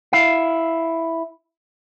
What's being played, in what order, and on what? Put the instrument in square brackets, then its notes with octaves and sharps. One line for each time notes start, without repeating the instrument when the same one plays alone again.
[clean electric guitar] E4 F5